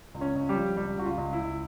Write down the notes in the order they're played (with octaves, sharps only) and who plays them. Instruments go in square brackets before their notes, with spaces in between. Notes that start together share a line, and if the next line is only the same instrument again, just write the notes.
[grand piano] C#2
C#4 C#5
C#2
G3 G4
F3
C#2 G3 G4
C#2 F#4
F4
C#2
E4
C#2